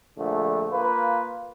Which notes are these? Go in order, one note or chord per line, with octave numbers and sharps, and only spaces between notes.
A#1 D3 A3
A#3 F4 B4